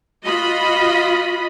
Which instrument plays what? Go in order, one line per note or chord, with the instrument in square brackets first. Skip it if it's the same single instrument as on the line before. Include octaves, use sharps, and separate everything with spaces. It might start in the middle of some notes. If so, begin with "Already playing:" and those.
[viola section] F4 F#4 D#5 B5